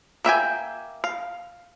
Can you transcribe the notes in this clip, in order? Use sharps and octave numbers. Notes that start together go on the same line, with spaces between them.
A#3 E5 G5 G#5
F5